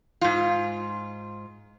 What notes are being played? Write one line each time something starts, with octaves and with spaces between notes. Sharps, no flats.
G#2 F4